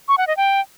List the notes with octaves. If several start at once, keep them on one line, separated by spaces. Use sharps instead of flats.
C#6
F#5
D#5
G5